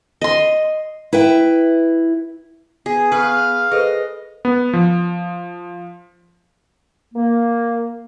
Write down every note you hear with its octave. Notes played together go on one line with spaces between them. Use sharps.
D#5 C6
E4 B4 E5 G5
B3 G#4
G#4 B4 F5 C#6
G#4 A4 B4 C5 D#5
B3
F3
A#3